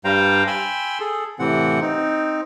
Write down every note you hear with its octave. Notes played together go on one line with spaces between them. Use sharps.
G2 G3 C5 F5 G5 A#5
G5 G#5 B5 C6 E6
G#4 A4
A2 C3 E3 C4 F#5
C4 D#4